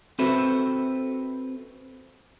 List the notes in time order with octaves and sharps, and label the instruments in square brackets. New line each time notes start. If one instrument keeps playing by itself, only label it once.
[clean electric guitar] C4 F#4 A4 B4 C5 E5